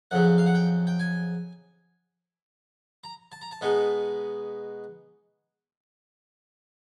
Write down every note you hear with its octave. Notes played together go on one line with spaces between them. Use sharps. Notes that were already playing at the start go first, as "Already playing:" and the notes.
F2 C#3 F#3 F#5
F5
F#5
G5
G5
G#5
A#5
A5
A#5
A5
B2 G#3 B3 D#4